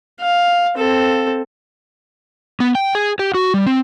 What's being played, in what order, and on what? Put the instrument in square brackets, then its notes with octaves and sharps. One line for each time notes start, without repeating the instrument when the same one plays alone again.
[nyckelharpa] F5
C4 A4
[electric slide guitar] B3
G5
G#4
G4
F#4
G3
C4